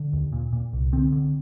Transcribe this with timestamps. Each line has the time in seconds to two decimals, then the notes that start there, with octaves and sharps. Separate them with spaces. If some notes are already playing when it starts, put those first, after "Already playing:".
Already playing: D3
0.13 D#2
0.32 A#2
0.53 A#2
0.73 C2
0.92 D3 C4
1.12 D3